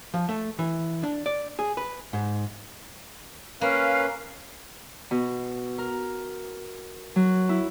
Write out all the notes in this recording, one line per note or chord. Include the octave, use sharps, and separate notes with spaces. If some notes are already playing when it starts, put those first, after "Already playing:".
F3
A3
E3
D4
D5
G#4
B4
G#2
A#3 C#4 B4 F5
B2
A#4
F#3
E4